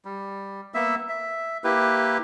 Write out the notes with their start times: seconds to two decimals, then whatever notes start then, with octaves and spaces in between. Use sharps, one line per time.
0.05 G3
0.74 A#3 B3 E5 E6
1.09 E5
1.64 A#3 E4 G4 B4